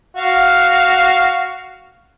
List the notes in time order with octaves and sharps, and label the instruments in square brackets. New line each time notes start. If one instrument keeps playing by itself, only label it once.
[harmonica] F#4 F5